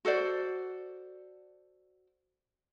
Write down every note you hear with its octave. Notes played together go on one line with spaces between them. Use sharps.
F#4 A4 C5 D5